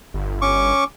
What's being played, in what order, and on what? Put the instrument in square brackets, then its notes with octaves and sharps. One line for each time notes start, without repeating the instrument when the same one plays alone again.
[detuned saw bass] G1
[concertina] C#4 C#6 D6